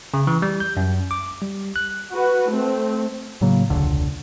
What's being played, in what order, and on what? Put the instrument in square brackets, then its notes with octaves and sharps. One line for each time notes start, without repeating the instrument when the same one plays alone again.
[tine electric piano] C#3
E3
G3
G6
F#2
D6
G3
F#6
[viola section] F#4 B4
A3 C4
[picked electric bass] A2 C#3 F#3 A#3
E1 C#2 D3